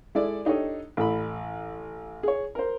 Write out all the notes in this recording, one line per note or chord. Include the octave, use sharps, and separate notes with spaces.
G#3 E4 A4 D5
D4 D#4 G4 A4 C#5 D#5
A1 A4 B5
G#4 C#5
A#4 C5